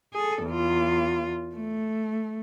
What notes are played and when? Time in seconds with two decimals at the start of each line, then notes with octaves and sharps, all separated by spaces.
0.14 G#4 A4
0.45 E2 F4
1.55 A3